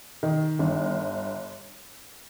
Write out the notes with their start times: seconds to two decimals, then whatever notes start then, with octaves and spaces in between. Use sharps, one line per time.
0.23 D#3
0.59 G1